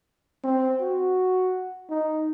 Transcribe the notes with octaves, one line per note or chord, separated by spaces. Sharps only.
C4
F#4
D#4